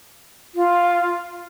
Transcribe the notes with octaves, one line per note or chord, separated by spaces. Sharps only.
F4